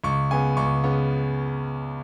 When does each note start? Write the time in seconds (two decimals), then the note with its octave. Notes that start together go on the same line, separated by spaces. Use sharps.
0.04 C#2 C#6
0.31 C#3 B3 G#5
0.57 C#2 C#6
0.84 C#3 B3